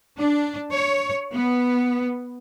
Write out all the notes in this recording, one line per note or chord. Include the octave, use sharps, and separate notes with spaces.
D4
C#5
B3